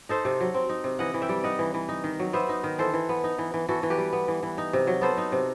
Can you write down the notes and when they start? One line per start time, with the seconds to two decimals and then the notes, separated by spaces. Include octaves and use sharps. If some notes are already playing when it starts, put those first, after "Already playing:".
0.09 D#4 A4 C5
0.25 C3
0.40 F#3
0.54 C4
0.69 D#4
0.84 C3
0.99 E3 D#5 F#5
1.14 E3
1.22 E5 G5
1.29 G3
1.44 D#4 D#5 F#5
1.59 E3
1.74 E3
1.89 D#4
2.04 D#3
2.19 F#3
2.33 B3 C5 E5
2.49 D#4
2.64 D#3
2.79 E3 A4 C5
2.94 E3
3.09 B3
3.24 D#4
3.39 E3
3.54 E3
3.69 E3 F#4 A4
3.83 E3
3.90 G4 B4
3.98 G3
4.13 B3
4.28 E3
4.43 E3
4.58 D#4
4.73 C3
4.87 F#3
5.01 B3 A4 C5
5.18 D#4
5.32 C3